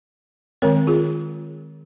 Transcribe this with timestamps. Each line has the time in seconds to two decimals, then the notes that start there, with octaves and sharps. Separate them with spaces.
0.62 D#3 G#3 C4 A#4 C#5
0.87 F4 G#4